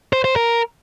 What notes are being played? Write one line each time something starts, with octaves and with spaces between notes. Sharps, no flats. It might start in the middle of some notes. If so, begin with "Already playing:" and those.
C5
C5
A#4